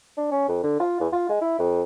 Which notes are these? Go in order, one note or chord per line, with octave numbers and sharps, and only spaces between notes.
D4
C#4
F2
D3
F4
E2
F4
G#3
E4
F2